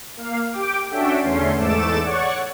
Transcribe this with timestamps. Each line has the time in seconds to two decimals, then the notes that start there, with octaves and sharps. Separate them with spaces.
0.17 A#3 F5
0.52 G4 G5 D6
0.90 C#4 D4 F#4 A4 E5 G5
1.22 E2 D3 A3 C#4 C6
1.58 E2 G#2 A3 A4 D6 E7
2.01 C#5 D5 F#5 C#6